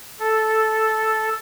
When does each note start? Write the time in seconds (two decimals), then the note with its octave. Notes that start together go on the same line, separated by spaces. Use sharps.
0.19 A4